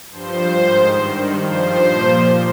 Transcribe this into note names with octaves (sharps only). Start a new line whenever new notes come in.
G2 F3 C5
G#2 D#3
G2 D#3
G2 F3 C5
A#2 F3